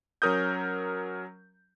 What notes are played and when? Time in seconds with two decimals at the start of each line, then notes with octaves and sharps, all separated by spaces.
0.22 F#3 C#4 A#4 D#6 G6